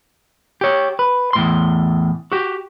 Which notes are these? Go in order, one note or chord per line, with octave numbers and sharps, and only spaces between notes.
G4 C#5
B4
E2 A2 C6
F#4 G4